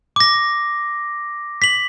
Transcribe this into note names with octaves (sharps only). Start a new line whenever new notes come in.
D6 A#6
B6 F#7